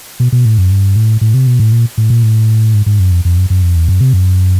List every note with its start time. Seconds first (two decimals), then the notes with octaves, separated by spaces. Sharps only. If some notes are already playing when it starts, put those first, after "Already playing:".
0.20 B2
0.32 B2
0.45 A2
0.58 F#2
0.71 G2
0.96 A2
1.21 A2
1.34 C3
1.47 B2
1.59 A2
1.72 A#2
1.98 A2
2.10 A#2
2.23 A2
2.74 G#2
2.86 G#2
2.99 F#2
3.11 F2
3.25 F2
3.37 F#2
3.50 F#2
3.62 F2
3.76 E2
3.88 F#2
4.00 C3
4.13 F#2